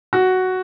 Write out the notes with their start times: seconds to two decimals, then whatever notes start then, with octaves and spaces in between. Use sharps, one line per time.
0.13 F#4